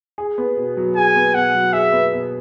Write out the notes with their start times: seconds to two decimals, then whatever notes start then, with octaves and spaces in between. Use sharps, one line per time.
0.18 G#4
0.38 B3
0.57 B2
0.77 F#3
0.96 G#4 G#5
1.15 B3
1.34 B2 F#5
1.54 F#3
1.73 G#4 E5
1.92 B3
2.12 B2